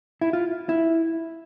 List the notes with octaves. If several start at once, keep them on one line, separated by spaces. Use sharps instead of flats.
E4
F4
E4